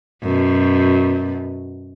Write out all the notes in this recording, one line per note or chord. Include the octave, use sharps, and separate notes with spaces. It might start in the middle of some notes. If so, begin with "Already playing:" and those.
F#2 B2